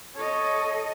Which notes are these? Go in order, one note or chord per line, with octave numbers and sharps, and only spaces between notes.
A4 C#5 D#5